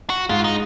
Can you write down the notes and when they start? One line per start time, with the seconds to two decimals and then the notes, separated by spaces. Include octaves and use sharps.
0.10 F#4
0.30 G#2 F4
0.44 D#4